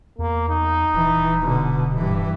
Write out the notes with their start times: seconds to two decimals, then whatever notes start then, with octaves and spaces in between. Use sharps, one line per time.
0.19 E2 A#3
0.49 D#4
0.93 D#1 E3
1.42 B2 D3
1.95 G2 E3